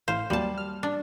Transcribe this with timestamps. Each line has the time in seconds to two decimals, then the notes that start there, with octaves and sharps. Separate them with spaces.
0.08 A1 A2 C5 F5
0.30 D#2 F#3 G3 A#3 A5
0.58 F6
0.83 D4